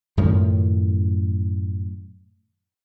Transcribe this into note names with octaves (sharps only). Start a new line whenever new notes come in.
F#2 A2 D#3 F3